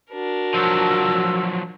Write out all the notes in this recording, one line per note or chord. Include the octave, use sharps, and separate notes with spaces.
D4 F#4 A#4
F3 F#3 E6